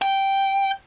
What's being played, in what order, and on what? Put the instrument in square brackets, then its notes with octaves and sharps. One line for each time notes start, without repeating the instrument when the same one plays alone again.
[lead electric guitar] G5